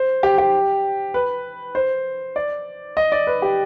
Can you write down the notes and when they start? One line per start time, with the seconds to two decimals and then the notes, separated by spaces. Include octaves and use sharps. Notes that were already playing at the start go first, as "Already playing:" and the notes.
Already playing: C5
0.23 G4
0.38 G4
1.14 B4
1.75 C5
2.36 D5
2.97 D#5
3.12 D5
3.27 B4
3.42 G4